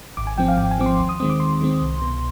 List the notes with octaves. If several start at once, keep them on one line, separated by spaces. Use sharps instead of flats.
G#1 D6
G#5
G#2 F3 C4 G5
F5
G#1 G5
G#5
G#2 F3 C4 D6
C6
D#2 C6
D#6
D#3 G#3 C4 D#6
D6
D#2 C6
D#3 G#3 C4
C2
B2 B3